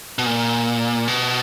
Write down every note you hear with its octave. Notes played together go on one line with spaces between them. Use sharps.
B2
A#2
B2